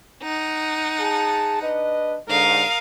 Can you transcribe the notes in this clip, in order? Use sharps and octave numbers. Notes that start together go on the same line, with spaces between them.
D#4 F#5
G#4 A5
D4 B4 D#5
G#2 D3 A#4 F5 D#6